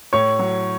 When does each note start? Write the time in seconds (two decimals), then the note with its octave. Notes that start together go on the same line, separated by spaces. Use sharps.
0.13 A2 C#5 C#6
0.39 F#3